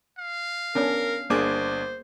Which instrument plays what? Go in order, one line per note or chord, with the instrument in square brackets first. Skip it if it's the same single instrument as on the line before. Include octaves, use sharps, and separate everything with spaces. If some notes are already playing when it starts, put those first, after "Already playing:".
[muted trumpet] F5
[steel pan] B3 C#4 D4 [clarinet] A#4
[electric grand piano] G1 D4 D6 [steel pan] A#3 G#4 [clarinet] C5